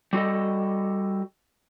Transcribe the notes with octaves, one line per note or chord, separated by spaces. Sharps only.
G3 F#4 A4 D#5